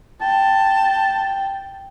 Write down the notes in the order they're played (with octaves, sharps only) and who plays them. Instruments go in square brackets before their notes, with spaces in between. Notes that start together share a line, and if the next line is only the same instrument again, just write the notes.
[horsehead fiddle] G5 [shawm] A5